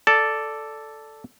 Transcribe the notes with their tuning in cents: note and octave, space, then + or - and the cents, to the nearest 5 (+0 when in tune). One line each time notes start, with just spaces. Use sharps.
A4 +0 D5 +0 A5 +0